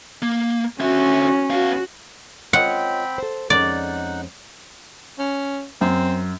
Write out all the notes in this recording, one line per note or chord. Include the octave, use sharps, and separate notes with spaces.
A#3
D3 C#4 F#4 E5
B3 F#4 F5
C4 F4 C#5 D#5 F#5 G5 B5
A4 C5
F2 G#3 C#4 D#4 D5 F#5
C#4
F#2 C4